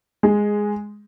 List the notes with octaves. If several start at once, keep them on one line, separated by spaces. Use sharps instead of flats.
G#3